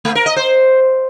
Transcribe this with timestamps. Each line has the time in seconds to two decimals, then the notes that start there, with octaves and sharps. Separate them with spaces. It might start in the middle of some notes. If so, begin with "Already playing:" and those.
0.05 A3
0.15 A#4
0.26 D#5
0.36 C5